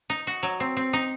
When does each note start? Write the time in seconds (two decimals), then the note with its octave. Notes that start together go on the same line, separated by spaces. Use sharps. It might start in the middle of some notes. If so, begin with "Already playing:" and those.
0.10 D#4
0.27 F#4
0.43 F#3
0.60 C4
0.77 C4
0.93 D#4